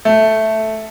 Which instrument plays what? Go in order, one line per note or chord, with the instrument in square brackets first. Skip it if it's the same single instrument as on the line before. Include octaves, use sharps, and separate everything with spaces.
[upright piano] A3